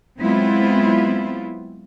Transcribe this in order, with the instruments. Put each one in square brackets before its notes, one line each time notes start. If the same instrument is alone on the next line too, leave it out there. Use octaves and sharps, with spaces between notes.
[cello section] F#3 G#3 B3 C4 E4 F4